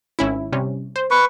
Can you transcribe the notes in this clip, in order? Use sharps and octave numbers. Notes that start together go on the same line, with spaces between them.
G#1 C#4 E4
C3 G3 C#4
C5
B4 C#6